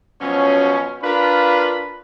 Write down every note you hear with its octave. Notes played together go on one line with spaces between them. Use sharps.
B2 F3 F#3 C#4
D4 F4 A#4 B4 F5 B5